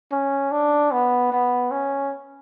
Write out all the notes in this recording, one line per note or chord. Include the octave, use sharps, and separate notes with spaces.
C#4
D4
B3
B3
C#4